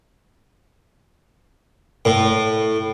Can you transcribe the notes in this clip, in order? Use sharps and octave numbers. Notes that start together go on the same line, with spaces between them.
A2